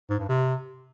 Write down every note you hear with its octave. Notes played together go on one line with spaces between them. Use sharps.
G#2
G2
C3